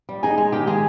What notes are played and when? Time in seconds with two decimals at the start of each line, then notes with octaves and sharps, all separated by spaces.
0.09 G3
0.23 D#4 G#4 G#5
0.38 G#3
0.52 D#3 G4 G5
0.67 G#3 G#4 G#5